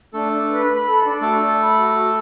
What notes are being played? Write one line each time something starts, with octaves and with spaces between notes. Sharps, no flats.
A3 D4 A4
D4
B4
B5
A4
D4
A3 F#4 A4
D5
B5
F#4
F#4